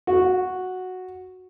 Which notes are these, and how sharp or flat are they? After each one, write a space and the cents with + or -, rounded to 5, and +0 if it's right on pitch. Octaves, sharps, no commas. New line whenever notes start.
F#4 -5